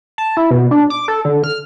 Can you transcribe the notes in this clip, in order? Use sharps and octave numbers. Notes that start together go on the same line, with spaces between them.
A5
E4
B2
D4
D6
A4
D3
F6